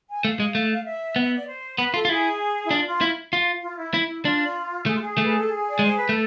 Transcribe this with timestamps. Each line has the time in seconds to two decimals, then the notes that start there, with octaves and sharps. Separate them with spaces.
0.09 G#5
0.25 A3 F5
0.40 G#3
0.55 A3
0.85 E5
1.16 B3
1.22 E5
1.35 D5
1.47 C5
1.78 B3 B4
1.94 F4 A4
2.05 F4
2.09 E4 G#4
2.64 E4
2.71 D4 F4
2.86 F4
3.01 E4
3.33 F4
3.63 F4
3.78 E4
3.94 E4
4.05 E4
4.25 D4 F4
4.86 A3 G#4
4.94 F4
5.01 G#4
5.18 A3 B4
5.36 A4
5.47 G#4
5.68 D5
5.79 G#3 C5
5.96 B4
6.09 A3 A4